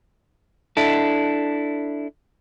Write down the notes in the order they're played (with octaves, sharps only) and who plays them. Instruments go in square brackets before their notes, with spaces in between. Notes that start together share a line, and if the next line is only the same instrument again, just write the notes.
[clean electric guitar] D4 E4 A4